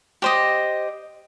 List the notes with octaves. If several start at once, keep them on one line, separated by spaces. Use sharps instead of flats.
G4 C5 D#5